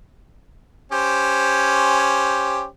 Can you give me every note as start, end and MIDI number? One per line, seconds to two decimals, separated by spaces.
0.92 2.65 61
0.92 2.65 67
0.92 2.65 72